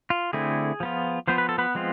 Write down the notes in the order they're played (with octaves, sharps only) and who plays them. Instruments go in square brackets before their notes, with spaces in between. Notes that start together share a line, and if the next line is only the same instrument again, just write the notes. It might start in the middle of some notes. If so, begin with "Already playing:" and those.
[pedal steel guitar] F4
D3 A3 C4 E4 G#4
F3 B3 F4
F3 B3 F4 C5
B4
A4
B3 B4
F3 G#3 C4 F4